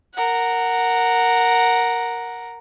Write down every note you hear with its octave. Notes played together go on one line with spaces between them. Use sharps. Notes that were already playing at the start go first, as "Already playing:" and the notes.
A#4 F#5